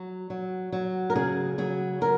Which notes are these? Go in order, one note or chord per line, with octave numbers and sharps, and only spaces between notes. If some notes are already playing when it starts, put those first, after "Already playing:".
Already playing: F#3
F#3
F#3
A#4
C#3 G#4
F#3 G#4
F#3 A#4